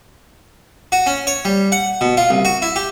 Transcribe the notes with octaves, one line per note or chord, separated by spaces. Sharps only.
F#4
C#4
C#5
G3
F#5
B2
F4
C2
F#4
E4
G4